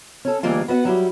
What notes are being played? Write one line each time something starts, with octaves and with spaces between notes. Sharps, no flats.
C#4 A4
D2 E3 G3 G#3 A#3 F4
B3 F#4 E5 F#5
F#3 G3 E4